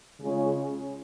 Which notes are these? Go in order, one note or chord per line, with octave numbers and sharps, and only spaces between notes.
C#3 G#3 C#4 F4